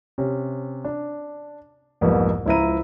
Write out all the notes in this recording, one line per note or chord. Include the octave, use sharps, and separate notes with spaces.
C3 C#4
D4
C2 F2 G#2 A#3 B3
C#2 F3 E4 C5 A#5 D#7